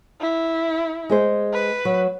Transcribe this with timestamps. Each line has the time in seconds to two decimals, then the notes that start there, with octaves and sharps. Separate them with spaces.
0.21 E4
1.09 G#3 G#4 C5
1.53 B4
1.85 F#3